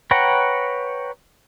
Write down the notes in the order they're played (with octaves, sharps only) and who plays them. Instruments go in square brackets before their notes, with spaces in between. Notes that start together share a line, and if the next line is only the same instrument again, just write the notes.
[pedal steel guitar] B4 C#5 F#5 G5 A#5